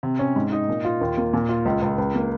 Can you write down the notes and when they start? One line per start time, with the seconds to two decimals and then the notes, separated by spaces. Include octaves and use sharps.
0.03 C3
0.19 C#4
0.36 G#2
0.52 D#4
0.69 A#2
0.85 F4
1.01 D#2
1.17 A#3
1.33 A#2
1.49 F4
1.65 C#2
1.82 C#2
1.98 C#2
2.15 A#3